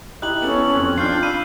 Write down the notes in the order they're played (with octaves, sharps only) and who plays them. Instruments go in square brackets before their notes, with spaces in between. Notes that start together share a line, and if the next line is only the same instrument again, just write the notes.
[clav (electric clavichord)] D#4 E4 G4 [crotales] F#6 F#7
[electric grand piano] B3 A4 [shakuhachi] C#4
[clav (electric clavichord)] F2 C4
[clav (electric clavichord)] C4 [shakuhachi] D4 [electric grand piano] D#4 F4 [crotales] F6 G6 C7
[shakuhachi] F5 [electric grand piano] B5 E6 [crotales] D#7